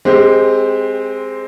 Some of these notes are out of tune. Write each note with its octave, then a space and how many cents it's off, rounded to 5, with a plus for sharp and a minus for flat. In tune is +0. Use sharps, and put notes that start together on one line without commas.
G#3 +0 C4 +0 G4 +20